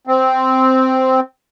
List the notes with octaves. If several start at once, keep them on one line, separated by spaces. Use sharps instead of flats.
C4